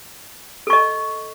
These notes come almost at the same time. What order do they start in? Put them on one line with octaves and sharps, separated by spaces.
A4 C#6 D#5